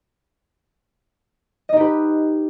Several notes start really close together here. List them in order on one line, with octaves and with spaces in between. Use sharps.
D#5 D#4 G4 B4